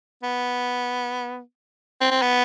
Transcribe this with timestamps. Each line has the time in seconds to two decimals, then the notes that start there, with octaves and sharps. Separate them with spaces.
0.23 B3
2.01 C4
2.11 C4
2.22 B3